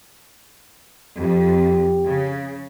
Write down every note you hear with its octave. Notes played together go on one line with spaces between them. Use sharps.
F2 F3 G4
C#3